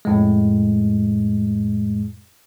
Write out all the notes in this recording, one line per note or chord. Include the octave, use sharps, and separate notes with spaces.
F2 A2 G#3